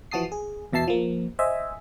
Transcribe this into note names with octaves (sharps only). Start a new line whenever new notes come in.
E3 F3 F#4 A5 D#6 C7
G#4
E2 B2 E5 A5 C7
F3 A#3
C5 D#5 E5 G#5